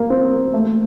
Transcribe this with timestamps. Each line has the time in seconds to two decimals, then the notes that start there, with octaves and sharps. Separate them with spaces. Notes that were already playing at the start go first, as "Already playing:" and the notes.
Already playing: A#3
0.10 C4
0.32 A#3
0.54 A3